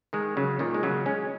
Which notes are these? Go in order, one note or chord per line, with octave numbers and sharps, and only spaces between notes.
D#3 G#3
C#3 F#3
A#2 D#3
G#3
C#3 F#3
G#3 C#4